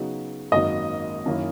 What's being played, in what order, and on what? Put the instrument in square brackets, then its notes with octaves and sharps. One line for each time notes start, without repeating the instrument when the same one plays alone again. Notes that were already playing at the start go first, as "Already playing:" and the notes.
Already playing: [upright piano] C#3 F#3 B3 D#4 F#4
[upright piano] G#1 F#2 D#3 F#3 A#3 [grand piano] D#5
[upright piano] F#2 D#3 A#3 C#4 E4